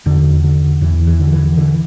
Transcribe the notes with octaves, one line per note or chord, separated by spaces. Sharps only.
E2 D3
D3
E2 E3
E3
D3
E3
D3 E3